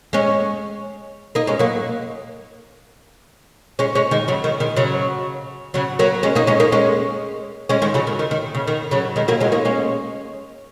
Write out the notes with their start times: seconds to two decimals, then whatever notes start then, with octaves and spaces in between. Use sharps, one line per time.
0.13 G#3 C#4
1.35 A#3 D#4
1.47 G#3 C#4
1.59 F#3 A#3
3.79 G#3 C#4
3.95 G#3 C#4
4.11 D#3 G#3
4.28 C#3 F#3
4.44 D#3
4.60 D#3 G#3
4.76 C#3 F#3
5.74 C#3 F#3
5.99 F#3 A#3
6.23 G#3 C#4
6.35 A#3 D#4
6.47 G#3 C#4
6.60 A#3 D#4
6.72 G#3 C#4
7.69 G#3 C#4
7.82 D#3 G#3
7.94 C#3 F#3
8.07 D#3
8.19 D#3
8.31 D#3
8.55 C#3
8.67 D#3
8.91 C#3 F#3
9.16 D#3 G#3
9.28 F#3 A#3
9.40 G#3 C#4
9.52 A#3 D#4
9.65 G#3 C#4